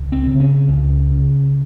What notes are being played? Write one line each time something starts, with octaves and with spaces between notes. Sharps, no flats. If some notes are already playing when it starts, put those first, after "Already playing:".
Already playing: C#2
C4
C#3
C#4
C#2
C#3